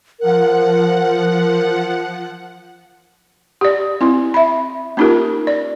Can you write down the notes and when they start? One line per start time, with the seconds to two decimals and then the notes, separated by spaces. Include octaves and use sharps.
0.20 F3 A#4 F#5
3.61 G4 D5
4.01 C4 E4
4.34 E5 B5
4.97 A#3 C#4 D#4 F4 G4 A#4
5.47 D5